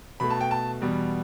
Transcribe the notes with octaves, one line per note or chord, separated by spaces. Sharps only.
B2 A3 B5
A5
G5
A5
E2 B2 G3 B3